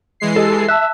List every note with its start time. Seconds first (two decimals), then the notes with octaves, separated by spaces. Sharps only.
0.20 E3 G#3 C7
0.36 G4 A4 D#5 G#5
0.68 E5 A5 E6 F#6